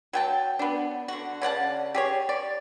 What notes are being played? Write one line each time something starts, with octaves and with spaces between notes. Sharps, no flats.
F#3 G5 A5
B3 D4
D3 F#4
C#3 D5 F#5 A5
G4 G#4 C#5
D5